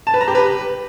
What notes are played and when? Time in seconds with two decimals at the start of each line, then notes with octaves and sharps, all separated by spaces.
0.07 A5
0.14 B4
0.21 A#5
0.28 G4
0.35 B4